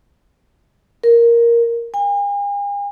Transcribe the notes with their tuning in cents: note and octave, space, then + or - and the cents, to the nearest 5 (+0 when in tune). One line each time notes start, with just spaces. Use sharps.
A#4 +5
G#5 -45